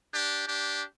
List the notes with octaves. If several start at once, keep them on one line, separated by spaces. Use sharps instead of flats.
D4 G4
D4 G4